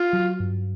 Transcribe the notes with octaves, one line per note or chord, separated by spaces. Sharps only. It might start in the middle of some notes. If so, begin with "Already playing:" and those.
Already playing: F4
F#3
G2